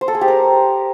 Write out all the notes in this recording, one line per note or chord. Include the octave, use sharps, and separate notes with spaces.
C5
A4
G#4
G4
A#4